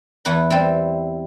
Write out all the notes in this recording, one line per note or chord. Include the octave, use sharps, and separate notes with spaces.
E2 B3 B4 B5
G3 C4 E4